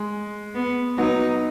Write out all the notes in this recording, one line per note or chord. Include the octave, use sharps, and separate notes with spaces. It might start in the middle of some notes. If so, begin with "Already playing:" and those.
Already playing: G#3
B3
F#3 B3 D#4